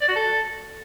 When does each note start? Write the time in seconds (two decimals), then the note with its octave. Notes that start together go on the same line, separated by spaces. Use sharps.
0.01 D5
0.09 F#4
0.16 A4